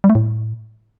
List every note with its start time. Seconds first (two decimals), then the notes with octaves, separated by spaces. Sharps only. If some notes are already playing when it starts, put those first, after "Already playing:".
0.04 G3
0.10 A3
0.15 A2